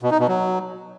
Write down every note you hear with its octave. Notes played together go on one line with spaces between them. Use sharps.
B2
D#4
B2
F#3